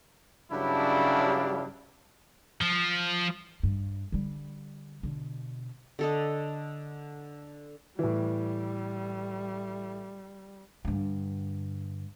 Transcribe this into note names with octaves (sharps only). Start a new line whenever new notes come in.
G2 C#3 F#3 G3 D4 E4
F3
G2
D3 G3
B2 D3
D3 A4 D#5
A2 E3 G3
G2 D3